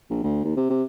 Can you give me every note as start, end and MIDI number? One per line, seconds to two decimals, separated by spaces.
0.10 0.20 34
0.23 0.40 38
0.44 0.52 39
0.57 0.69 48
0.70 0.83 48